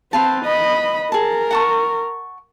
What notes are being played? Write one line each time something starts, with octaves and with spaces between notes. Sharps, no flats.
C4 B4 F5 A5
D#5 B5
G#4 A#4 A5
F#5 A5 C#6